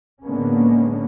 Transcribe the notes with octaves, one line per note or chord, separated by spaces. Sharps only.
A2 D3 G#3 A#3 B3 C#4